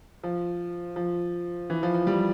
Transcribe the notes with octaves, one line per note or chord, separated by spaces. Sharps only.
F3
F3
E3
F3
F3
G3